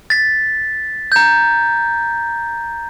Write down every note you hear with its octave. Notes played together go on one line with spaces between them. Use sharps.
A6 B6
A#5 G6